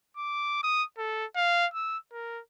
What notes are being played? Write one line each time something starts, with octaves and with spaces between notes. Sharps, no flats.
D6
D#6
A4
F5
E6
A#4